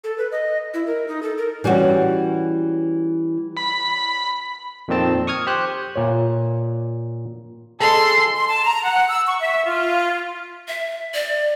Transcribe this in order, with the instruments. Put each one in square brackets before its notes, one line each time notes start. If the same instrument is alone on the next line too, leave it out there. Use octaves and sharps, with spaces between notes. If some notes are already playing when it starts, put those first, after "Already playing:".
[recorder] A4
B4
D#5
E4
A#4
D#4
A4
A#4
[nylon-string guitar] E3 G3 C#4 F#4
[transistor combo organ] B5
[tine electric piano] F2 A#2 D#3 C4 A5
C#6 D#6 F6 G#6
G4 C5 F#6
[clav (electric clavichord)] A#2 C#5
[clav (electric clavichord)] G#4 D#5 [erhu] A4 [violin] C6
[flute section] C6
A5
A#5
F#5
E6
C#6
E5
F4
[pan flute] E5
D5